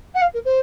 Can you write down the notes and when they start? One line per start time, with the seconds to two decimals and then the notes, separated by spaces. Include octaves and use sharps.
0.14 F#5
0.21 F5
0.33 A#4
0.45 C5